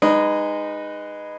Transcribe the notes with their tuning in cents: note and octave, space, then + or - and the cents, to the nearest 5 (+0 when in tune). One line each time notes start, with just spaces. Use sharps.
G#3 -20 D#4 -15 B4 +0